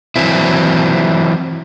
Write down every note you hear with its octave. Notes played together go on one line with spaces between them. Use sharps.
E3 F#3 C4 E4